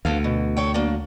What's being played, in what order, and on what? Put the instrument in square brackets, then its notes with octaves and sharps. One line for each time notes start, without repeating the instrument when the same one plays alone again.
[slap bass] D2 [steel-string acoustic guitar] B3 A4 F5
[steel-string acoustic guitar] B2
A4 C#5 G5
F#3 A#3 D4